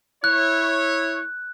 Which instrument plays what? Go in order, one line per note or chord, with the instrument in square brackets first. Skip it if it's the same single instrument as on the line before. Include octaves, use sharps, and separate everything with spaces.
[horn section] E4 C#5 [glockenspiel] F#6